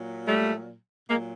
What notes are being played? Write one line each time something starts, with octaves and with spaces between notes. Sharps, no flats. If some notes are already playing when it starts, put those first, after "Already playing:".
Already playing: A#2 F#3
G3 A3
A#2 F#3 G#3 A#3